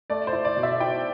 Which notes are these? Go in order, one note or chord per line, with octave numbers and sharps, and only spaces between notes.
A3 D5
C5
E4
D5
B2
E5
E4 G5